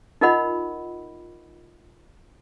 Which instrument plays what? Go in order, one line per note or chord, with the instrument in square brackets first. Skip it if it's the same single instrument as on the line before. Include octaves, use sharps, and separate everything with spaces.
[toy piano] D#4 F4 A#4 D#5 F#5 B5